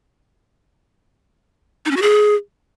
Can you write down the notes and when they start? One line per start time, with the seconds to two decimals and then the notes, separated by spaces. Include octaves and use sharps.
1.86 D#4
1.91 C#4
1.97 F#4
2.02 G#4